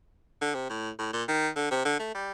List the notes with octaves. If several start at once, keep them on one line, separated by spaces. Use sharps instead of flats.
D3
C3
A2
A2
A#2
D#3
D3
C3
D3
A3
G3